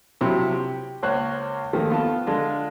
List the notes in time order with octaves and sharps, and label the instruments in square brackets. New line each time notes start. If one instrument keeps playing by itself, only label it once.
[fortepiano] C3 F3 F#3 E4
G4
C#2 A#3 C5 C#5 F5 F#6
D#3 F3 A3 A#3
B3 F4 A4 A5
D3 G#3 D4 F4 A4